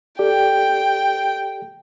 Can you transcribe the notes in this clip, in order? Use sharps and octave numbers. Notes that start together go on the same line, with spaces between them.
G4 A4 D5 G5